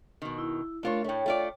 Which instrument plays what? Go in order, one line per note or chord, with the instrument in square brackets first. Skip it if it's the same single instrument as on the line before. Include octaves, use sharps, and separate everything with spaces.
[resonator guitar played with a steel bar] B2 D#3
[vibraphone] E4
[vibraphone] A3 A#4 [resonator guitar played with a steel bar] D4 F4 C#5
[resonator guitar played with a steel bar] A2 A3 [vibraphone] C#5 G5
[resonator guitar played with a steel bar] A3 F4 D5